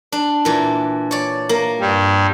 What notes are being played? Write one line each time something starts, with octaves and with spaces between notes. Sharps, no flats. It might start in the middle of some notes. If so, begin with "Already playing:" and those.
D4
A#2 E3
C#5 D5
A#3
G2 G3